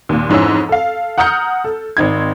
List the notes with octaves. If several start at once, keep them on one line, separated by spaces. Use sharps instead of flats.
D#2 A#2
F2 G#2 E3 C#4 E6
A4 F5
F#5 A#5 D#6 F6 G6 C#7
A4
G#1 C4 D#4 G#6